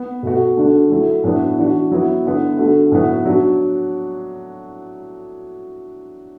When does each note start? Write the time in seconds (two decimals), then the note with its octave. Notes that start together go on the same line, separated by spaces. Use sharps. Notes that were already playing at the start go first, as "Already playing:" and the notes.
Already playing: B3
0.23 B2 A3 F#4
0.57 D3 A3 D4 F#4
0.90 F#3 A3 E4
1.24 A2 F#3 B3 D4
1.58 E3 D4 F#4
1.92 F#3 B3 E4
2.25 D3 B3 E4
2.58 D3 A3 F#4
2.92 A2 F#3 B3
3.25 F#3 D4 F#4